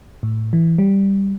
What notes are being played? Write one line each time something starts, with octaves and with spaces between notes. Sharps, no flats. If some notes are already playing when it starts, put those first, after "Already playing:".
A2
E3
G3